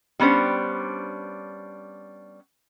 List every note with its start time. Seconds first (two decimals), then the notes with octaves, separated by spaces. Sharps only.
0.19 G3 B3 C#4 D4 C5